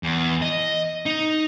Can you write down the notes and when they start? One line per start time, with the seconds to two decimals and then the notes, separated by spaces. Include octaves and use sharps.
0.03 E2
0.42 D#5
1.06 D#4